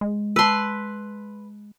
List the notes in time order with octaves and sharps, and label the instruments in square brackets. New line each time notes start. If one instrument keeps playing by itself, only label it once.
[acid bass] G#3
[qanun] B4 C6 [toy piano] A5 E6